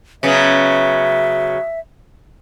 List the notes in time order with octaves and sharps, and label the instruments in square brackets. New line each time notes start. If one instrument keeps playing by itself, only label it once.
[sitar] C#3 F#3 B3 [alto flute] E5